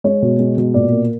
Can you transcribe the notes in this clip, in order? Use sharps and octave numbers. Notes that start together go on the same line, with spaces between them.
G#3 C#5
B2
G#3
B2
A#2 D5
A#3